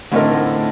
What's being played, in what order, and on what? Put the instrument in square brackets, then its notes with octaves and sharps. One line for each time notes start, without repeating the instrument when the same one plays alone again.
[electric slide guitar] A2 [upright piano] D3 A3 C4 D#4 A#4